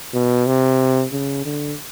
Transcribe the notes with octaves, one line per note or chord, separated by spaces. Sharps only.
B2
C3
C#3
D3